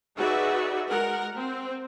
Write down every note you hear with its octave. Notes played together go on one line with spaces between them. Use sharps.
D#4 F#4 G#4 B4 D5 E5
G#3 A#4 F#5
C4